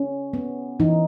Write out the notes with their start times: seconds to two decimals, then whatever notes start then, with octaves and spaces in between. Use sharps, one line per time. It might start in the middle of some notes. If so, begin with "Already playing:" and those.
Already playing: C#4
0.33 B3
0.80 E3 D#4